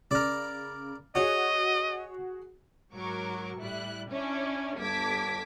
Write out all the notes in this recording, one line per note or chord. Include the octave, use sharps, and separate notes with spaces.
C#3 A#4 D5
F#4 G#4 C#5 D#5
G#2 F#3 A#4 C#6 D6
A2 G3 E4 F#6
C#4 D4 E4 C#5 D5
G1 A5 D6 G#6 B6